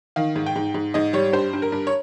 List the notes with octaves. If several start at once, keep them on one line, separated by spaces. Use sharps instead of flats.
D#3 F5
G#2
G5
G#2
G#2
G#2 D#5
G3 C#5
G2 C5
G2
A#4
G2
C#5